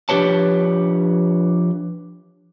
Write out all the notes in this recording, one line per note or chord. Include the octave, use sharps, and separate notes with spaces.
F3 D4 G4 B4 C#5 A5